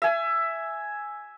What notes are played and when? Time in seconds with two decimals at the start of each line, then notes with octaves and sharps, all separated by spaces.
0.02 E5 G#5